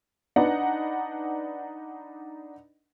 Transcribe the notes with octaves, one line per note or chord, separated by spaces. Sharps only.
D4 D#4 B4 F#5